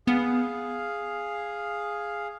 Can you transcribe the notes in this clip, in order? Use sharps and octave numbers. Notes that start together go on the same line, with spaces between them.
B3 G#4 F5